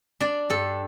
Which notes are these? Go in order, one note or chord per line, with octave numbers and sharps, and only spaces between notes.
D4 D5
G2 A4